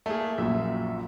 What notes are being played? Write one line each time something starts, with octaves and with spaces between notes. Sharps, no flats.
A3 A#3 G#4
A#1 F#2 A#2 E5